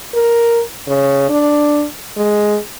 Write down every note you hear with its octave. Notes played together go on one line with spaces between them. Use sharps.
A#4
C#3
D4
G#3